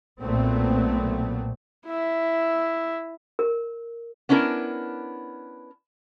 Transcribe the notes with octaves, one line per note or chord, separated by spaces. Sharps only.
B1 A#2 A3 B3 C4
E4 E5
A#4
B3 C#4 D4 E4 A#4